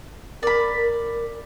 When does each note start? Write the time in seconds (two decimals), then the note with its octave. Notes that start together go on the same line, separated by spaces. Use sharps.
0.43 A#4 D5 B5
0.77 A#4